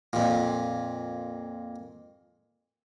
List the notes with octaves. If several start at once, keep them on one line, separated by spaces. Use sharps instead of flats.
F2 A#2